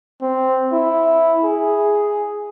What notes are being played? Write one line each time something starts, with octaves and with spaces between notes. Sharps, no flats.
C4
E4
G#4